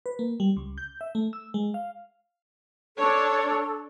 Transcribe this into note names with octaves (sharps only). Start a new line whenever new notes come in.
B4
A#3
G3
C#2
G6
E5
A3
E6
G#3
F5
D4 A4 C#5